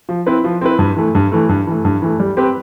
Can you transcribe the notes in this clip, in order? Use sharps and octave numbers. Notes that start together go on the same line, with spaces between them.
F3
C4 E4 B4
F3
C4 E4 B4
G2
E3 A3
G2
E3 A3
G2
E3 A3
G2
E3 A3
G3
C4 G4 B4